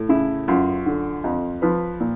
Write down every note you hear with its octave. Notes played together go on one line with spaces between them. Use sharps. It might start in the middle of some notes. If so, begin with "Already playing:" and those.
Already playing: A2
C#3 E4
F#2 F4
D3
F2
F3 B4
A#2